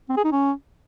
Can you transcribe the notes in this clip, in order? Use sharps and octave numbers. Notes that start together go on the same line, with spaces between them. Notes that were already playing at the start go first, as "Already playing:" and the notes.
C4
G#4
D#4
C#4